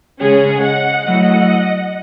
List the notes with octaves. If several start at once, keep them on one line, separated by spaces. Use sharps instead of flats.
C#3 G#3 C#4 G#4
D#5 F#5
F#3 A3 E4 D#5 F#5